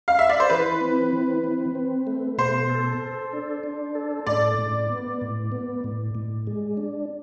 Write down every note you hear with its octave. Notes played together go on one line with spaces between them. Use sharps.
F5
E5
D5
C5
E3 B4
C4
E3
C4
C4
A3
B2 C5
A4
A4
D4
D4
A4
A2 D5
A2
B3
A2
B3
A2
A2
G#3
D4